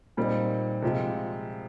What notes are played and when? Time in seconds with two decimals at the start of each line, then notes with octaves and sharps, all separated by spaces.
0.17 A#2 G3 C4 D#4
0.82 C3 F3 G#3